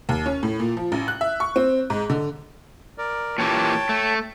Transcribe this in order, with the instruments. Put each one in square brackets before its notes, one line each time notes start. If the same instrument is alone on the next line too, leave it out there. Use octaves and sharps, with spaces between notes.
[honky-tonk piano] D#2
C#4
A2
A#2
F3
A1
F#6
E5
C#6
C4
G#2
D3
[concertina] A#4 D5
[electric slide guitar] A#2 E3 G4 [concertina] C#5 G5 A5
[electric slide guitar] A3